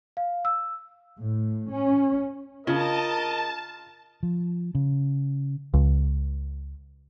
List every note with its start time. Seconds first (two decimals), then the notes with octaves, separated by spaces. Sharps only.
0.17 F5
0.45 E6
1.18 A2
1.72 C#4
2.67 C#3 F4 A#4 D#5 A5
4.23 F3
4.75 C#3
5.74 C#2